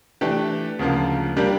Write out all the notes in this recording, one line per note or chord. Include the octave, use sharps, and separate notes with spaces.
E3 A3 D4 G4
D2 C#3 F3 A#3
G3 A#3 D4 G4 A#4